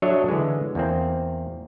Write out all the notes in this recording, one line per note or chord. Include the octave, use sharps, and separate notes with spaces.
F#3 D4 A4 C#5 D#5 E5
D3 E3 G#3
E2 A#3 C4